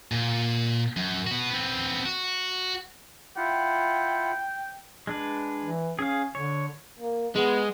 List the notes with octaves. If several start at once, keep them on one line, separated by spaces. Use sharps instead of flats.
A#2
F#2
B3 F#4
B3 C4
F#4
E4 F4 F#5 G5
G#3 D4 B4
E3
C#4 G#4 F5
D3 C#5
A#3
G#3 B3